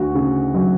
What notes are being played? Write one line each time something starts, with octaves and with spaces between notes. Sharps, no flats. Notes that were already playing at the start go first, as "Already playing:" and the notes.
Already playing: D2 F#4
C#3
F#3